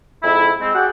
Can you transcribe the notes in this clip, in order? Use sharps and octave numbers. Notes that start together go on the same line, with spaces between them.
F2 G#2 E4
G#3 C4
F#4 G#4 D5 F#5 G5